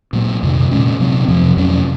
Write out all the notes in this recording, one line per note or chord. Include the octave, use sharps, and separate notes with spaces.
A#2 F#3 A#3
F2 C3 D#3
A#2 G#3 C#4
C3 F#3 C4
F2 C3 F3
F2 C3 F#3 C#4